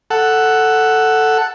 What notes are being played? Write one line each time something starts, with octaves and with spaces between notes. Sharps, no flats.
A4 F#5